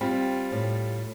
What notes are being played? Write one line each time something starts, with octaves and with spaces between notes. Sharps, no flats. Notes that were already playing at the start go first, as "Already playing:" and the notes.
G3 C4 F4
A2